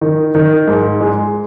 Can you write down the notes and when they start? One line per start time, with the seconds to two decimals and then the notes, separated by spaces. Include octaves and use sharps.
0.01 D#3
0.35 D#3
0.68 G#2
1.01 G#3